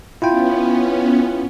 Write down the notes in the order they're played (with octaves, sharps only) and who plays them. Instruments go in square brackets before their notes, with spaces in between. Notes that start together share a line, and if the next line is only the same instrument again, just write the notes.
[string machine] B3 C#4 [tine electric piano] E4 F4 G5